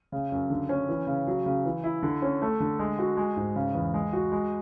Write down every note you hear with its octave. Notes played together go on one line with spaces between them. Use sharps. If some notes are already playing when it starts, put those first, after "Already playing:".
C#3
F#2
D3
C#4
E3
C#3
F#3
C#3
E3
E4
D3
C#4
A3
D3
G#3
F#4
G#3
G#2
C#3
E2
G#3
F#4
G#3